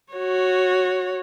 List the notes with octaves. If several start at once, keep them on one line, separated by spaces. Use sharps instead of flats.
F#4 C#5